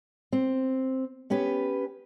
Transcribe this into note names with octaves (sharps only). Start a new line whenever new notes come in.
C4
B3 C#4 G4 B4